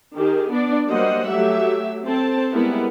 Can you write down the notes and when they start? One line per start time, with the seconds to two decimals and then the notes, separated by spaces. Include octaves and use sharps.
0.16 D#3 G4 G#4
0.50 B3 D4 D5
0.87 F#3 G3 A#3 C5 D#5 F#5
1.30 F#3 A3 G4 E5
2.05 C4 A4 C5 A5
2.53 G3 G#3 B3 E4 A#4